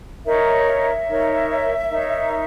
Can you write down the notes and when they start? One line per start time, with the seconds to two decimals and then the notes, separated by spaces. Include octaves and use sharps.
0.24 D#4 A#4 C#5 E5
0.66 E5
1.07 D#4 A#4 C#5
1.90 D#4 A#4 C#5